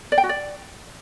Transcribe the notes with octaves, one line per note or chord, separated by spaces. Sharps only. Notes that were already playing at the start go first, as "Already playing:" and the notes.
D5
G5
F#4
D5